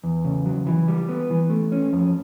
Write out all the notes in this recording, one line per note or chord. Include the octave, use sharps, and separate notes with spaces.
E2
C#3
F#3
E3
G3
B3
E3
A3
C#4
F2